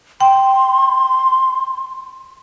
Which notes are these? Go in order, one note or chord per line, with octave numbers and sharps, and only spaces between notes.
G5 C6